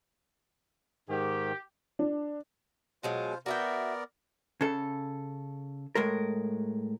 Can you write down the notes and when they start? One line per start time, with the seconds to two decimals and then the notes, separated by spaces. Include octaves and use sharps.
1.09 G#2 D#3 G4
1.99 D4
3.03 B2 F#3 G#3 F4 C5
3.46 B3 F#4 A#4 D5 E5 G5
4.61 C#3 A4
5.95 A2 G#3 A#4